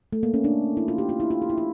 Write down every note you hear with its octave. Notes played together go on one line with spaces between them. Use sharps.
A3
A#3
C#4
D4
E4
F4
G4
F4
E4
F4
G4
E4
F4